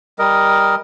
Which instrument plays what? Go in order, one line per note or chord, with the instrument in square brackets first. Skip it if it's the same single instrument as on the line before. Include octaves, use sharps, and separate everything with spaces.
[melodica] G3 A#4 D#5